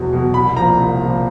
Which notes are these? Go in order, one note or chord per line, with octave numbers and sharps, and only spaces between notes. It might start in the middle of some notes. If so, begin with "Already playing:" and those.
Already playing: E2 B2 F#3
B2 F#3
C2 B5
A#2 F3 A#5
C2
A#2 F3